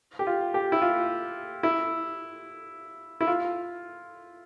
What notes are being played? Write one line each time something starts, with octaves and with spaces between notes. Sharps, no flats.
G4
F4
G4
E4
F4
E4
E4
F4